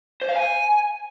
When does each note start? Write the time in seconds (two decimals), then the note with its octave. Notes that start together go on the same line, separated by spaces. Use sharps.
0.22 C5
0.29 F5
0.36 G#5